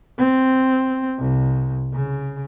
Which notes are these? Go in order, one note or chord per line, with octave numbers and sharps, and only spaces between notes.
C4
C2
C#3